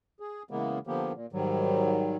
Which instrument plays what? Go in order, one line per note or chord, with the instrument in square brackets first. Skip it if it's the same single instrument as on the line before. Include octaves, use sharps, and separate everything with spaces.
[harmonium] G#4
C#3 E3 G#3 A#3 B3
D3 F3 A#3 B3 G4
A#2
G#2 D#3 F#3 G3